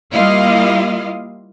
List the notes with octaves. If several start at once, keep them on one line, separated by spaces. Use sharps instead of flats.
G3 A#3 E4 F4 D#5 F5